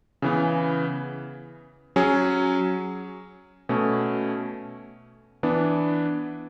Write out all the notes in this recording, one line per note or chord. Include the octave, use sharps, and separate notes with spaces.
C#3 E3 B3
F#3 C#4 G#4
B2 A3 C#4
E3 B3 D4